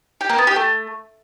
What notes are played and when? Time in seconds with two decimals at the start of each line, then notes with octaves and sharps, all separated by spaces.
0.21 G4
0.29 A#3
0.38 B3
0.47 G4
0.56 A3